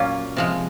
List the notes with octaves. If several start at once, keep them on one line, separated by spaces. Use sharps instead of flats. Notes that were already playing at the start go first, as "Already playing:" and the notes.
Already playing: A#2 F#3 A#3 C#4 F4
C3 F3 G#3